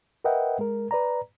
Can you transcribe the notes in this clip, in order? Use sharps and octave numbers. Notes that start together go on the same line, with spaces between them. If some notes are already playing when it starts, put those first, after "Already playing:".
A#4 B4 D#5 E5 F#5 G5
G#3 A#4
B4 D5 A#5